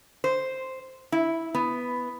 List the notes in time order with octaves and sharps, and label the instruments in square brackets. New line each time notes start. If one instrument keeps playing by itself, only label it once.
[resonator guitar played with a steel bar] C5
E4
B3